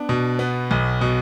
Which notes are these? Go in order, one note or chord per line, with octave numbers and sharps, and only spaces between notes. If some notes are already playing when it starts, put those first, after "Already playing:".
Already playing: B3 D4
B2
B3
B1
B2